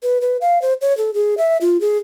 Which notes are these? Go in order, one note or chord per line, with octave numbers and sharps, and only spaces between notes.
B4
B4
F5
C5
C#5
A4
G#4
E5
F4
G#4